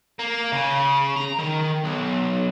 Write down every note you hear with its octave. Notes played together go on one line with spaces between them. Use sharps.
A#3
C#3
A#5
D#3
B1